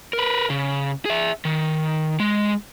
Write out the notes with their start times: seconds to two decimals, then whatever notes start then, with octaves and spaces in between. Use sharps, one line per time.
0.13 A#4 B4
0.50 C#3
1.05 G#4 E5
1.45 D#3
2.20 G#3